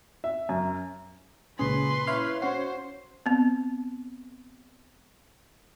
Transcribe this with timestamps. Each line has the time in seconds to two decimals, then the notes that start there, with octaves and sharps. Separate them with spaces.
0.24 E5
0.49 F#2
1.59 C#2 A#2 C#4 G#4 B4 C6
2.07 E4 C#5 F5
2.42 C#4 F#4 C5 C#5 C7
3.26 B3 C4